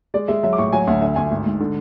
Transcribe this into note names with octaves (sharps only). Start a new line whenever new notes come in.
G#3 D5
G#3 E5
F#3 E5
D6
A1 C#6
F#3 G#5
D2 F#5
D3 E5
D2 G#5
G#1
G#2
D3